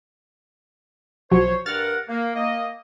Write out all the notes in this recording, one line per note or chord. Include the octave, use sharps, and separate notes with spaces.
B1 F3 F#3 C5 C#5
G2 A#4 F#5 F6 A6
A#3
A#3 D#5